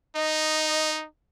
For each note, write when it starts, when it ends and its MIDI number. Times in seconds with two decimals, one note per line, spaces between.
0.16 1.06 63
0.16 0.89 75